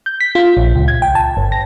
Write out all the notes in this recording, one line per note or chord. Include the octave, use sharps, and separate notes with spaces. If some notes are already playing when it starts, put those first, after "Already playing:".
G6
B6
F4
A#1
C#2
G#6
G5
A5
G1
A#6